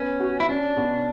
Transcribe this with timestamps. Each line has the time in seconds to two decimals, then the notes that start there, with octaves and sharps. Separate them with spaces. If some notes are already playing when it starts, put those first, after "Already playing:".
Already playing: B3 C#4
0.20 F#4
0.40 E4
0.49 C#4 D4
0.76 B2